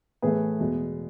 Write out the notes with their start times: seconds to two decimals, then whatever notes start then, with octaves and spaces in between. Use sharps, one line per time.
0.22 A2 E3 A3 G#4 B4
0.60 E2 B2 G#3